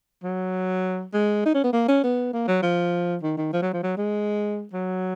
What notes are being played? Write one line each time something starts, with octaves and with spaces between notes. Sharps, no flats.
F#3
G#3
D#4
C#4
B3
A#3
C#4
B3
A#3
F#3
F3
D#3
D#3
F3
F#3
F3
F#3
G#3
F#3